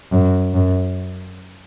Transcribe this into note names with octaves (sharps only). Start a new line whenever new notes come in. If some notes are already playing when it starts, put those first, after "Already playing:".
F#2
F#2